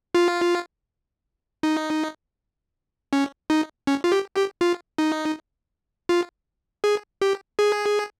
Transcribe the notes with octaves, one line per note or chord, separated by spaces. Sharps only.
F4
D#4
C#4
D#4
C#4
F4
G4
G4
F4
D#4
F4
G#4
G4
G#4